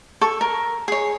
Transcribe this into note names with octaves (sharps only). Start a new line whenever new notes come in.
A4 C#6
A#4
G#4 C#5